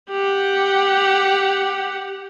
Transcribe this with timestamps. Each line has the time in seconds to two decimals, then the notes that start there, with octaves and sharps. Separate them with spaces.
0.11 G4 F#5